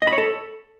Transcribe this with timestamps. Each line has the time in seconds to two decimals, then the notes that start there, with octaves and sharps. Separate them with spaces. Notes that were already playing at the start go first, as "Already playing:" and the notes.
0.02 D#5
0.07 B5
0.13 C#5
0.18 A4